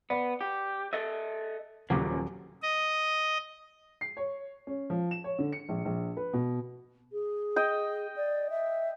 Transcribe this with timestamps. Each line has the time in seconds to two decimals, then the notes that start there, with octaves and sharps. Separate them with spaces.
0.10 B3 D5
0.41 G4
0.93 A4 D#5 E5
1.90 D#1 C#3 F3 F#3 A#3 D6
2.62 D#5
4.01 C7
4.17 C#5
4.67 C#4
4.90 F3
5.11 E7
5.24 C#5
5.39 D3
5.53 C#7
5.69 A#1
5.85 A#1
6.17 B4
6.33 B2
7.12 G#4
7.56 D#5 G5
8.16 D5
8.50 E5